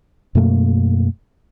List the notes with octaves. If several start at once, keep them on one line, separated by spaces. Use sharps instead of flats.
F#2 B2 A3 A#3